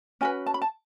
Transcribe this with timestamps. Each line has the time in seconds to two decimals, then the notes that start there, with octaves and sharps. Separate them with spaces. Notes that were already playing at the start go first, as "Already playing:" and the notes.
0.21 C#4 F#4 B4 G#5
0.46 A5
0.54 B5
0.62 A5